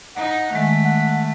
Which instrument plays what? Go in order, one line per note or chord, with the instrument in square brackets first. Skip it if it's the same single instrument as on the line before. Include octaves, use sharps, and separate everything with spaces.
[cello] D#4 [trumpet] F#5
[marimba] D#3 G#3 [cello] A3
[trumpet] F#5